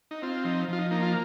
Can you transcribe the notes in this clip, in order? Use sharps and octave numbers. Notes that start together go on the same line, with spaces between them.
D#4
C4 F4
F3 D#4
F3 F4
D#4
A#3 D#4
F4